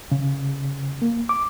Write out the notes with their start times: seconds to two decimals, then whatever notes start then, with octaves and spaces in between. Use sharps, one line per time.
0.12 C#3
1.02 A#3
1.29 D6